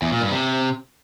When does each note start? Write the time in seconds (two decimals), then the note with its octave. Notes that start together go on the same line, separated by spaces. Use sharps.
0.02 E2
0.12 A#2
0.22 G2
0.31 C3